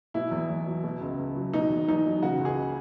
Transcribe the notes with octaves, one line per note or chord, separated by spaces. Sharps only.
B2 E4
E2
E2
F#3
B2
C#2
C#2
F#3
B2 D#4
E2
E2 D#4
F#3
C#3 F#4
C#2
G#4